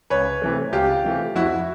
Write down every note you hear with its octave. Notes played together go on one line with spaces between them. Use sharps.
C#2 B4 C#5
C3 E3 A3
C#2 F4 G4
C3 E3 A3
F2 E4 F#4